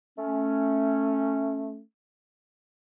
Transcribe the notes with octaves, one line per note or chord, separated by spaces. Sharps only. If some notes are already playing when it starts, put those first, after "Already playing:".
A3 C#4